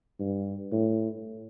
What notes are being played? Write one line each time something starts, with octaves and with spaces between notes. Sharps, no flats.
G2
A2